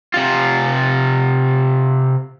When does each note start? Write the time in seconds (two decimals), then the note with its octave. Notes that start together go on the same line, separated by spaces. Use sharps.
0.14 C3 F4